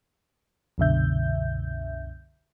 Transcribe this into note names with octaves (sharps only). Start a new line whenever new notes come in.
C2 F#2 B2 D3 E5 G6